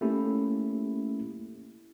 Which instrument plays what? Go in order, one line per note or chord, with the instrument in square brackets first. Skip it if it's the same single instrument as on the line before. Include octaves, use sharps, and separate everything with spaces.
[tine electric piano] A3 A#3 C#4 E4 G4